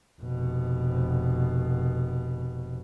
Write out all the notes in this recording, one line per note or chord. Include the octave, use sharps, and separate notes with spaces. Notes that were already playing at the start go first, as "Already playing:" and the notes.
F1 B2